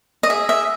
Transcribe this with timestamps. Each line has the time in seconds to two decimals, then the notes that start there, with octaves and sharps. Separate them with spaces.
0.23 D#5
0.30 G#4 E5
0.49 D#5 E5